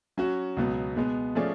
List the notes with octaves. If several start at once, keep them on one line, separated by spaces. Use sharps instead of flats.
F#3 C#4 F#4
C#2 B2 F#3 B3
B2 G#3 B3
F3 A3 C#4 G#4 D5